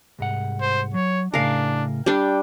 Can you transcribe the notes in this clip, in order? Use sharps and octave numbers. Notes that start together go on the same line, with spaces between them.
C2 G#2 F#5
C5
F#3 C#5
A2 C#3 D4 A#4 F5 G#5
G3 D4 G5